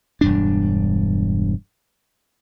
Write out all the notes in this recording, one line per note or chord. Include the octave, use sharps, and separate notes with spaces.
E1 G2 D4